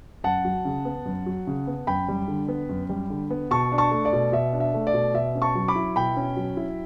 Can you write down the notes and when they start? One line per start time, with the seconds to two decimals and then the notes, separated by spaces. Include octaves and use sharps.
0.24 F#2 F#5 A5
0.45 F#3
0.65 C#3
0.85 B3
1.06 F#2
1.26 F#3
1.47 C#3
1.67 B3
1.87 F#2 G5 B5
2.08 G3
2.28 D3
2.48 B3
2.69 F#2
2.89 G3
3.10 D3
3.30 B3
3.51 B2 A5 C#6
3.72 D4
3.78 A5 C#6
3.91 A3
4.05 D5
4.13 B2
4.32 B2 E5
4.53 D4
4.60 E5
4.74 A3
4.87 D5
4.94 B2
5.14 B2 E5
5.35 C#4
5.42 A5 C#6
5.55 F#3
5.68 B5 D6
5.75 E4
5.96 B2 G5 B5
6.17 C#4
6.37 F#3
6.57 E4